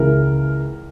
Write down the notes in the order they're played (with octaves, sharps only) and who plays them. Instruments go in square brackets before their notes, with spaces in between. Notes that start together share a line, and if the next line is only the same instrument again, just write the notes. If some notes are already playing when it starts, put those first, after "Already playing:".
Already playing: [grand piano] C#2 C#3 E3 A#4